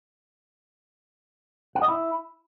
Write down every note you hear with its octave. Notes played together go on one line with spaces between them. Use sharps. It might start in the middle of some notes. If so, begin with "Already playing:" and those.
F#5
D#5
E4